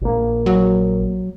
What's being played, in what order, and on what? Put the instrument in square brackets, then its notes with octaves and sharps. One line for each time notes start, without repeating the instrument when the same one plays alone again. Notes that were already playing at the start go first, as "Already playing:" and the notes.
[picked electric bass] A#1 A#3
[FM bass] F#3